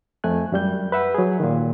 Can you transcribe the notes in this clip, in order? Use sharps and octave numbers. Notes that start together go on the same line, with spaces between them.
F2 A3 G#5 F#6
F#2 G3 G6
B4 E5 F#5
F#3 G#4
A#2 D#3